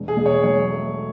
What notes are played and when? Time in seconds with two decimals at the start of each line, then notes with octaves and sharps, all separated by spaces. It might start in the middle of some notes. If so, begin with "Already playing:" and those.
Already playing: E1
0.08 G#4
0.17 E1
0.26 C#5
0.43 F#3 C#5
0.70 A3